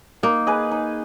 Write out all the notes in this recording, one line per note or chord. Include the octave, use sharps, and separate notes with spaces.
A#3 D#4
G#4 B4 D#5
D#4